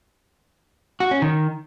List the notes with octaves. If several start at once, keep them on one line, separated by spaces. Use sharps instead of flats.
F#4
C#4
D#3